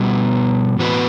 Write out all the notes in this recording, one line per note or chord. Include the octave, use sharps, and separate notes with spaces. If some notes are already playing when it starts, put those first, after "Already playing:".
Already playing: B2 G3 B3 F#4
A2 E3 B3 F#4 B4